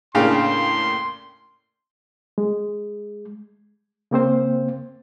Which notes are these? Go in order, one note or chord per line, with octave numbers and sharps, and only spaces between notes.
A2 C#3 A#3 D4 F5 G5 C6
G#3
C#3 A#3 C4 C5